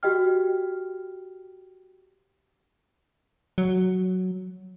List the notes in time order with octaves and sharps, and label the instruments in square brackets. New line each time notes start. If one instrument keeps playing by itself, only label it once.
[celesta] F#4 G4 D#5 G5 F6
[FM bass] F#3